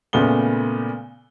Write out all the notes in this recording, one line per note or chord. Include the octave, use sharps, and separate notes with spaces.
A#2 C#3 A3 B3 G7